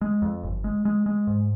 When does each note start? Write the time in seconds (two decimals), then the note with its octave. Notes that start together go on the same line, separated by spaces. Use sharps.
0.01 G#3
0.22 F2
0.43 G1
0.64 G#3
0.85 G#3
1.06 G#3
1.27 G#2